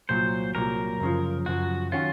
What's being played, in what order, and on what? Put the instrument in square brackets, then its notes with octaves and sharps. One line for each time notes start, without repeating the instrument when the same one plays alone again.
[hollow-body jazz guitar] C2 A#2 F#3 [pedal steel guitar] C5
[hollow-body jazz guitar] C2 A#2 F#3 [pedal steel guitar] A#4
[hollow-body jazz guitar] F#2 C#3 F3
[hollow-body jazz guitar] F#2 C#3 F3 [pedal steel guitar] F#4
[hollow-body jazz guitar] D#3 F#3 C#4 F#4 [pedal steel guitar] F4